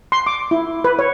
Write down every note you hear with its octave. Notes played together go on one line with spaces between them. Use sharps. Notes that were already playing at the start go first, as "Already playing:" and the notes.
C6
D6
E4
B4
C#5